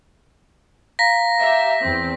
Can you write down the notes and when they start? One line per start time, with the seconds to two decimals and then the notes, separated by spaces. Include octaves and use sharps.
0.99 F5 A#5 A#6 B6
1.39 G4 E5
1.82 E2 C4